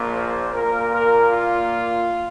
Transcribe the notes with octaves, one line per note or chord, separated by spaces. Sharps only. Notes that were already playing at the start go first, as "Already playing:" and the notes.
Already playing: A#1 A#2 A#3
C5
A#2 A#3 A#4
A#4
F4